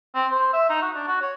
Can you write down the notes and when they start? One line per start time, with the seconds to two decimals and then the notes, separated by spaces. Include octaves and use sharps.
0.15 C4
0.31 C5
0.53 E5
0.69 D#4
0.82 F#4
0.95 D4
1.08 F#4
1.21 C#5